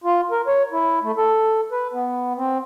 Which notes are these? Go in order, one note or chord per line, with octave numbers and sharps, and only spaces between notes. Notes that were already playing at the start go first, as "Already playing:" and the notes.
F4
A#4
C#5
E4
A3
A4
B4
B3
C4